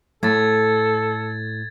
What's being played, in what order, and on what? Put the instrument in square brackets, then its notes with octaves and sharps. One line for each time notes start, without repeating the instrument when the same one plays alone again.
[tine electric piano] A2 [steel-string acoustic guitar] A3 [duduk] A4 [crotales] G#6 A6